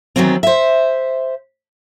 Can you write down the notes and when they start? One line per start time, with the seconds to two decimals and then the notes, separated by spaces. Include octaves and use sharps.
0.16 D#3 E3 F#3 B3 C4
0.43 C5 E5